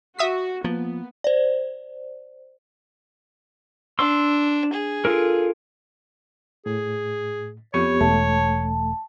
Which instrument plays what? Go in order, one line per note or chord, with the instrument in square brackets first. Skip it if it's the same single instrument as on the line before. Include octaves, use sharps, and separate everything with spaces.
[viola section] F#4 [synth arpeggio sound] E5 D#6 B6
[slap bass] F3 [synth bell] A#3 [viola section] B3
[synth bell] C5 D5
[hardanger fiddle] D4 [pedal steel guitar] C6 E6
[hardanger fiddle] G#4
[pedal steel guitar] F4 A4 A#4
[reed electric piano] A2 [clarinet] G#4
[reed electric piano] F2 C#6 [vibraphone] B3 G4 [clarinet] C#5
[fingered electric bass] E1 [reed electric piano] A3 [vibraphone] A5